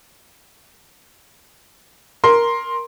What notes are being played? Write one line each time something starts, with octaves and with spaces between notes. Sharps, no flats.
A#4 C6